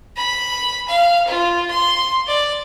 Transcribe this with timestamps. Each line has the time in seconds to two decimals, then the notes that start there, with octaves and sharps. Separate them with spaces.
0.17 B5
0.88 F5
1.27 F4
1.71 C6
2.28 D5